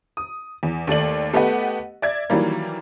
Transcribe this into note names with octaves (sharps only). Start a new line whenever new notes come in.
D#6
E2
D#2 A3 D5 F#7
A3 B3 G4 B4 D#5 F#5
D5 E5 G#6
D#3 E3 F#3 G3 A#3